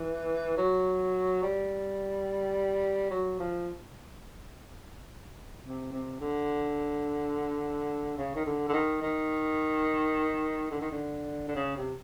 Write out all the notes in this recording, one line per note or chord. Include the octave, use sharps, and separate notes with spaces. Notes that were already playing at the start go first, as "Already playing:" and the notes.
Already playing: E3
F#3
G3
F#3
F3
C3
C3
D3
C#3
D#3
D3
D3
D#3
D#3
D3
D#3
D3
D3
C#3
C3